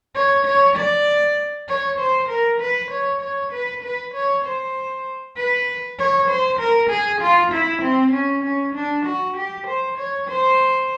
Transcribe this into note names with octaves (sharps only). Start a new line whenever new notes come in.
C#5
C#5
D5
C#5
C5
A#4
B4
C#5
C#5
B4
B4
C#5
C5
B4
C#5
C5
A#4
G#4
F4
E4
C4
C#4
C#4
D4
F#4
G4
C5
C#5
C5